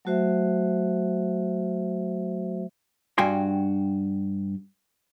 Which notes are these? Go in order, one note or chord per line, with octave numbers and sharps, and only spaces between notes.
F#3 A3 F#4 C5 E5
G2 F#4 G5 G#5 C6